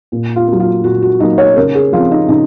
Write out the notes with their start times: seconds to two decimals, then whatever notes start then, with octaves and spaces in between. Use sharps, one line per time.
0.12 A#2
0.36 F4
0.47 F#3 A#3
0.60 F4
0.84 A#2 F#4
1.02 F#4
1.20 F#3 A#3 D#4
1.38 C#5
1.56 C#3 A#4
1.75 G#4
1.92 F3 F4
1.97 C4
2.11 D#4
2.28 C#3 D#4